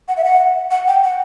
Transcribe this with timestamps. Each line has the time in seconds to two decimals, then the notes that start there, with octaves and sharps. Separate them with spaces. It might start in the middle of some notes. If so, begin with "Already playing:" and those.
0.08 F#5
0.17 E5
0.24 F#5
0.71 F#5
0.87 G5
1.03 F#5